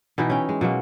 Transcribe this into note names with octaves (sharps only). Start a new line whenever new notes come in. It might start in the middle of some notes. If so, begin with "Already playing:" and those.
B2 E3 D#4 E4
C#4 G5
G#3
B2 F#3 G#3 A#3